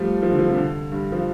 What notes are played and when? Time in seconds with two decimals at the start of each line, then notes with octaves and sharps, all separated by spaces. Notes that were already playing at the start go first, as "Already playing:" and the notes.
Already playing: F3 G3 A3
0.22 F3
0.31 D3
0.39 F3
0.49 C3
0.57 D3
0.92 G2
1.12 F3